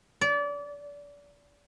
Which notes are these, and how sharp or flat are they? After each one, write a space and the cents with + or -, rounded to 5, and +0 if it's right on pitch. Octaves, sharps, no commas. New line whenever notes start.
D5 -30